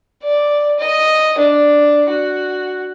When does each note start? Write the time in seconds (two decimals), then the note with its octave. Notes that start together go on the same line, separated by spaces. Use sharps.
0.24 D5
0.79 D#5
1.38 D4
2.09 F#4